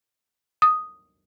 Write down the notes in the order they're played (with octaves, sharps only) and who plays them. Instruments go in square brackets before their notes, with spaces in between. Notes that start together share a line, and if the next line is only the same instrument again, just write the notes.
[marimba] D#6